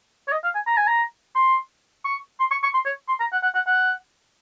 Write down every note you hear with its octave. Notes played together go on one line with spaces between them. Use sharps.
C#5
D#5
F5
G#5
A#5
G#5
A#5
C6
C#6
C6
C#6
C#6
C6
C#5
C6
A#5
F#5
F#5
F#5
F#5